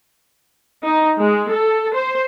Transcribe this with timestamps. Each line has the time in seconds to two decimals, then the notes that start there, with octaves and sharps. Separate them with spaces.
0.85 D#4
1.21 G#3
1.52 A4
1.94 C5